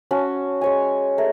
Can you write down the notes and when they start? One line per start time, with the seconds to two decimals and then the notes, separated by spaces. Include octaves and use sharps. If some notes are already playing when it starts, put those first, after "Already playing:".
0.11 C#4 F#4 A5
0.61 G#3 C#5 G#5
1.18 A3 G#4 A#4 E5